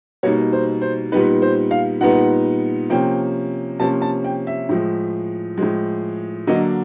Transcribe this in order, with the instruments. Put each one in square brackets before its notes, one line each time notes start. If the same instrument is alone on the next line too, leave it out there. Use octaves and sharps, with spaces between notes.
[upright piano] B2 G3 A#3 D#4 C#5
C5
C5
A#2 G3 B3 D#4 B4
C5
F5
A#2 G3 B3 D#4 F#5
C3 F3 A#3 C#4 G5
C3 F3 A#3 C#4 A5
A5
G5
E5
A2 F3 G#3
A2 F3 G#3
D3 F#3 A#3 D4 D#5